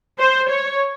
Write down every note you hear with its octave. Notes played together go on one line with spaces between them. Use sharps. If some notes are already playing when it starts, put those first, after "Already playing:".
C5
C#5